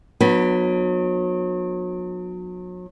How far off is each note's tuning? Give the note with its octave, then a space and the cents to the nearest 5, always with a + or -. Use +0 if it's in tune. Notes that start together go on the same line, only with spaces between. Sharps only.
F#3 -35 B3 -20 D4 +30